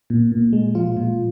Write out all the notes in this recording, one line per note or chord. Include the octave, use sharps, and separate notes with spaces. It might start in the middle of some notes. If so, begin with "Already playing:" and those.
A#2
A#2
G#3
F3 F4
A#2